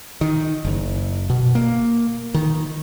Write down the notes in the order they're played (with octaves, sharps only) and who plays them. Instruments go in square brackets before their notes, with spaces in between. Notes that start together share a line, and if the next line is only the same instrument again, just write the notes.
[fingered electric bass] D#3
F#1
B2
A#3
D#3